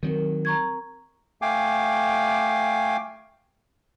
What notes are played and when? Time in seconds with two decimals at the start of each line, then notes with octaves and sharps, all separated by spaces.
0.03 D#3 F#3 C4 A#4
0.45 A#5 C#6 G#6
1.42 A3 F5 G5 G#5 D6